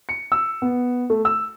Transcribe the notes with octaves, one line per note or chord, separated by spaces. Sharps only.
C#7
E6
B3
A3
E6